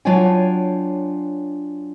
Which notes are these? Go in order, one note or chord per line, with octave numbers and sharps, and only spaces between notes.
F#3 D4 F4 C#5 G5 G#5